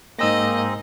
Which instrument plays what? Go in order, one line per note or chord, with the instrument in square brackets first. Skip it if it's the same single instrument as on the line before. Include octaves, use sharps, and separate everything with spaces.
[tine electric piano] G#2 E6 A#6 [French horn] A#3 [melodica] C4 D#4 G#4 [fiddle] D#5